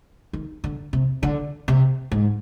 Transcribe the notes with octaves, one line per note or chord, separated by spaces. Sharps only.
D#3
D3
C3
D3
C3
G#2